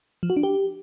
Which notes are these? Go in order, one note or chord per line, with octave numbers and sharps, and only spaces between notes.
F3
F#4
D4
G4